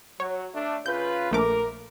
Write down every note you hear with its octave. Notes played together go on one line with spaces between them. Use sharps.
F#3 C#5
A3 D4
C#3 F4 B4 G6
A#1 A3 A#4 D6